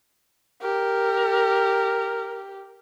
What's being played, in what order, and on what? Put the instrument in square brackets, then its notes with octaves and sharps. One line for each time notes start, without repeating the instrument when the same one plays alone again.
[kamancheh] G4 [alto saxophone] A#4